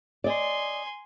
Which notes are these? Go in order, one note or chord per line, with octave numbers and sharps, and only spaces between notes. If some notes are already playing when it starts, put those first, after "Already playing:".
D5 D#5 G#5 C6